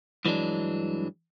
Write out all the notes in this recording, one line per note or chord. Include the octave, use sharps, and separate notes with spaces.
G2 E3 F#3 G#3 D4